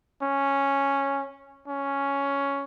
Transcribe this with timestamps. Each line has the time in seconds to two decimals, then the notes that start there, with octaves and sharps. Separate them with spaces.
0.22 C#4
1.68 C#4